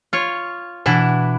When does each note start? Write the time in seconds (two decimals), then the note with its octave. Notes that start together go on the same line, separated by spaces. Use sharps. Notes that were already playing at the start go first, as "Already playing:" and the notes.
0.13 F4 C#5 F6
0.86 B2 E3 D4 E4